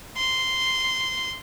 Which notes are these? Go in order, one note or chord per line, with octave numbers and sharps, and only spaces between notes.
C6